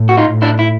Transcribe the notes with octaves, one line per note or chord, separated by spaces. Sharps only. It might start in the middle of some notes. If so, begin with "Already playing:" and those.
Already playing: A2
F#4
D#4 F4
A2
D4 E4
E4